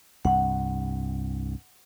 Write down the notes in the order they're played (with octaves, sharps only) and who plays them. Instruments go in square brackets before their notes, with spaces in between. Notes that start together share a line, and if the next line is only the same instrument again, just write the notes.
[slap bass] C2 G2 [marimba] F#5